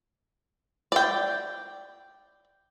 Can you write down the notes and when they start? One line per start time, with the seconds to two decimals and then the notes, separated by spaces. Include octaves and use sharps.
0.92 D5 G5